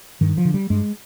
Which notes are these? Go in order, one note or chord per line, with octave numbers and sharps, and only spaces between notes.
G2 D#3
F3
D3
G3
G2 G#3